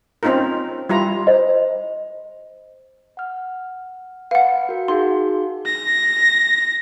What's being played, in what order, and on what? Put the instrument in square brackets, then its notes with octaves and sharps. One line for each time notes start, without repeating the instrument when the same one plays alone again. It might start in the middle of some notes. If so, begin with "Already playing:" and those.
[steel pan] C4 C#4 D#4 F4 A#4
G3 E4 F4 A#5
[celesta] C5 D#5
[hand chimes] F#5 F6
[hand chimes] B4 [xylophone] F5 F#5
[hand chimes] F#4 A#4
[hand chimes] D#4 F#4 G#4 [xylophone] F5 C6
[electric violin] A#6